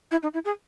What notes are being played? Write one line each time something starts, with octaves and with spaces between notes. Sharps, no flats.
E4
D#4
E4
G#4